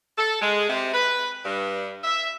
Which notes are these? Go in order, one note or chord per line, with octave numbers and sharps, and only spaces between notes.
A4
G#3
C3
B4
G2
E5